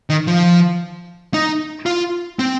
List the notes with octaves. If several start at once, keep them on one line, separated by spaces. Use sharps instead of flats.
D#3
F3
D#4
F4
C4